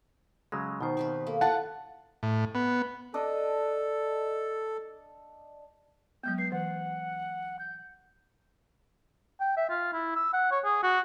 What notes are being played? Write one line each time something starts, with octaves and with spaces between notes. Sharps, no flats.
C#3 F#3 G#3 E6
B2 D#3 D#4 C5
C4 G4 B4
A#3 A4
E4 F4 B4 F#5 A5
A2
B3
D4 A4 D#5
F#3 G#3 B3 G6
B4 C7
E3 F#5
G6
G5
E5
F4
E4
E6
F#5
C#5
G#4
F#4